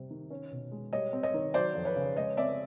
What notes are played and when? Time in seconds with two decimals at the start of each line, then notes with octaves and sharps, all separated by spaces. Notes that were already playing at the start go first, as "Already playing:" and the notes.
Already playing: C3 G3
0.10 D#3
0.31 C#4
0.52 B2
0.72 G#3
0.93 G3 C#5 D#5
1.13 C4
1.23 C#5 D#5
1.34 D#3
1.54 F#3 C5 D5
1.75 F2
1.85 B4 C#5
1.96 C#3
2.16 G#3 C#5 D#5
2.37 C4 D5 E5